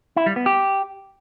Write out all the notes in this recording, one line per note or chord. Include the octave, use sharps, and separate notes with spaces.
E4
G3
B3
G4